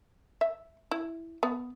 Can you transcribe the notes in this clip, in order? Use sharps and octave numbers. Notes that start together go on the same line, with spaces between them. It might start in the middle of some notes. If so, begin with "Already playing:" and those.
E5
E4
B3